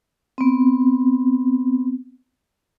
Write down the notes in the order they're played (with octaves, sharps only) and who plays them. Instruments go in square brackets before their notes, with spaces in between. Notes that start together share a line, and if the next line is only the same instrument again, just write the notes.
[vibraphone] B3 C4